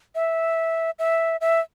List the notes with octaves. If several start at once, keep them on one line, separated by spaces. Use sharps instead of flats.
E5
E5
E5